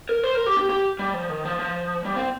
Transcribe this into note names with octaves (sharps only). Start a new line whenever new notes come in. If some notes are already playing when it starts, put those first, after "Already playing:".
A#4
C5
A#4
G4
G4
G4
G3
F3
D#3
F3
F3
G3
C4